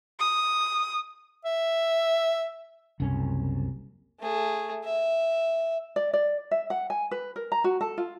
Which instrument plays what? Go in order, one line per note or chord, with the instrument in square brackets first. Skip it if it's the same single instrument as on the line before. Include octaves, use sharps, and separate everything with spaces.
[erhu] D#6
[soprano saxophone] E5
[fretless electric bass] F#1 C2 C4 C#4
[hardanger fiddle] A3 G#4
E5
[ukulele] D5
D5
E5
F#5
G#5
B4
A#4
A#5
F#4
A4
F4